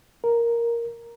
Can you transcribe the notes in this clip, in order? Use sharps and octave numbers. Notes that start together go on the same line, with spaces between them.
A#4